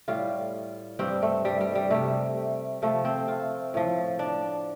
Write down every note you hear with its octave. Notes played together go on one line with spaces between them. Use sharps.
A2 G3 F4
G2 G3 C4
A3
G3
G3
G3
C3 G3 A3
C3 F3 A3
C4
F4
A2 F3
D4